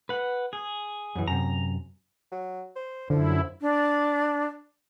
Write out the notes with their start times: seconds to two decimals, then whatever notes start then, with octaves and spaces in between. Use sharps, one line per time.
0.09 B4 F#5
0.53 G#4
1.15 F#2 E3
1.28 F#2 C3 A#5
2.32 F#3
2.76 C5
3.10 F#2 D3 F3 E4
3.61 D4